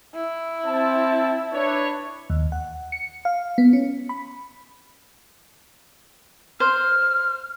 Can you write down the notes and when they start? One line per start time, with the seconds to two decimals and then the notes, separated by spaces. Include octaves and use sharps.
0.14 E4
0.66 C4 A5
1.53 D4 B4 C#5
2.30 D#2
2.52 F#5
2.92 C#7
3.25 F5
3.58 B3
3.73 C#4
4.09 B5
6.60 C5 F6